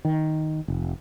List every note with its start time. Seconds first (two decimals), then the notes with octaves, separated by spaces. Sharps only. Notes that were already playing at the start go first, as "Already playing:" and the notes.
0.05 D#3
0.68 F1